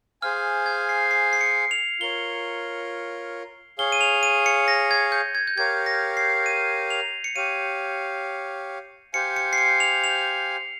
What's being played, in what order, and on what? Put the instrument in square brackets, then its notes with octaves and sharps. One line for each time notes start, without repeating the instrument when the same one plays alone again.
[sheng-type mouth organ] G#4 C5 F5 G#5 [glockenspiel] F6
[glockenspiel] G#6
C7
C7
C7
C#7
F7
[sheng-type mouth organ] F4 A#4 C#5 [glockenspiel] G7
[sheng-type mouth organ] G#4 C#5 F5 [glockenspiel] G7
[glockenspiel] D#7
F7
D#7
C#7
A#6
G#6
G6
G#6
G6
[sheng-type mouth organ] G4 A#4 C#5 F5 [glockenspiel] G#6
[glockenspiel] A#6
C7
D#7
F7
C#7
[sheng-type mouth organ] G4 C#5 F5 [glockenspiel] D#7
[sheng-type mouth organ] G4 C5 F5 G#5 [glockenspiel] C#7
[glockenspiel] C#7
C7
C#7
F7
F7